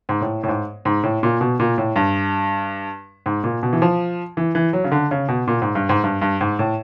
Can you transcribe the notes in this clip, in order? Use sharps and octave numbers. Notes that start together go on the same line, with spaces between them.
G#2
A2
A2
G#2
G#2
A2
A#2
B2
A#2
A2
G2
G#2
A#2
B2
E3
F3
E3
E3
F#3
C#3
D3
C#3
B2
A#2
G#2
G2
G#2
G2
G2
G#2
A2